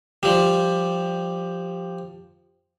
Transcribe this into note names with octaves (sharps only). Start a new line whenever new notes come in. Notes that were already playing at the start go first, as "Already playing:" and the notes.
F3 G3